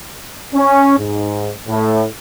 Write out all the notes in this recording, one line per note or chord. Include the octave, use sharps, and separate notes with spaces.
C#4
G#2
A2